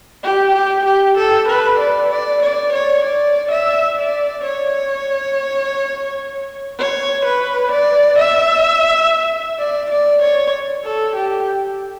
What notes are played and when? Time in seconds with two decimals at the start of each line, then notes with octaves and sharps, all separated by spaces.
0.23 G4
0.55 G4
0.86 G4
1.18 A4
1.49 B4
1.80 D5
2.11 D5
2.43 D5
2.73 C#5
3.05 D5
3.51 E5
3.98 D5
4.45 C#5
6.79 C#5
7.26 B4
7.72 D5
8.19 E5
9.59 D5
9.90 D5
10.22 C#5
10.85 A4
11.16 G4